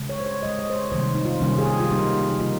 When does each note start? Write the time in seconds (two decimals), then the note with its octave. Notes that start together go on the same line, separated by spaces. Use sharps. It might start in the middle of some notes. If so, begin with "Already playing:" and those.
Already playing: C#3 G#3
0.09 C#5
0.20 C5
0.26 C#5
0.43 C#3 G#3 D#5
0.59 D#5
0.70 C5
0.75 C#5
0.92 C3 D#3 G3 A#3 C5
1.15 D#4
1.25 F4
1.41 C3 D#3 G3 A#3 C#4
1.58 G#4
1.69 G4
1.80 F4
1.90 C#3 G3 A#3 D#4
2.32 D#4
2.40 C#3 G3 A#3 F4